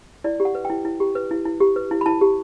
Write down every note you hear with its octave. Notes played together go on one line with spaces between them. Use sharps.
E4 D5
G4
F#5
B4
E4 G5
E4
G4
B4
E4
E4
G4
B4
E4
B5
E4 A5
G4